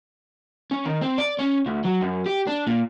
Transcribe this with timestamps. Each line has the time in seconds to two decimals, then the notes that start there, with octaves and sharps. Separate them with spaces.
0.71 C#4
0.86 D#3
1.02 C4
1.18 D5
1.39 C#4
1.66 D2
1.84 F#3
2.01 F#2
2.26 G4
2.47 D4
2.67 A#2